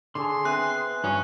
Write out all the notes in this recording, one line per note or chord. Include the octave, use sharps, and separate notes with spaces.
D3 G#4 A4 C#5 C6
B3 C4 G#4 E5 F#6
G2 F#3 C#4 C#5 D#6